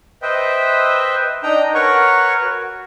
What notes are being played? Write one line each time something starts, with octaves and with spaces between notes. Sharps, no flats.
B4 C5 D#5 E5 G5
D4 D#4 D#5 G5 A#5
A#4 B4 C#5 F#5 C#6
F#4